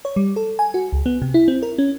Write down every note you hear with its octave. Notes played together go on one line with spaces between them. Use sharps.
C#5
G3
A4
G#5
F#4
C#2
B3
C3
E4
C4
A#4
C#4